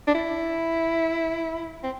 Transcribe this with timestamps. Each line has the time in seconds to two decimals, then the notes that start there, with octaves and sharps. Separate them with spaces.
0.07 D4
0.15 E4
1.83 C4